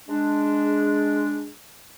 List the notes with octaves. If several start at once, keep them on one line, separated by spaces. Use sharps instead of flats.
G#3 D4